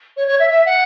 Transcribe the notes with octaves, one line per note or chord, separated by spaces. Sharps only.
C#5
C#5
E5
E5
F#5